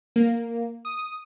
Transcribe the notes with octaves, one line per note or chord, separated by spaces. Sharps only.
A#3
D#6